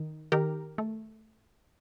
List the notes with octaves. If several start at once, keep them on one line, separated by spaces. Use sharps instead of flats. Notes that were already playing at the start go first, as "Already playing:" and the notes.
Already playing: D#3
D#3 G4 A#4
A3